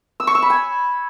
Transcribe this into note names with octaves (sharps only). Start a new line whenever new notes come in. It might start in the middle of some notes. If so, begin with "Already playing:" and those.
E6
C#6
E6
B5
G#5